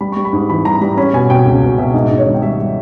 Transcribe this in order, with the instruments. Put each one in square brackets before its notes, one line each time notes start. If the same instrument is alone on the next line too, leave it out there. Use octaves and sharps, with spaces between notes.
[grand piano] G3 B5
G3 C#6
B5
G#2
E3 B5
G3 A#5
G3 B5
C#4 B5
B2 G#5
B2 G5
C#2
B2
B2 E5
G#2 D#5
G#2
C#5
G#1
G5
G3 E5
G3